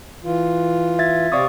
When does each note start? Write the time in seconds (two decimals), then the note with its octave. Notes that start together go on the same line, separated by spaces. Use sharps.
0.24 E3 F4
0.99 E5 G#6 A6
1.32 C3 C4 D5 F5 C#6 D#6